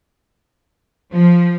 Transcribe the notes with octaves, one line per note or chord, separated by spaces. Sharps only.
F3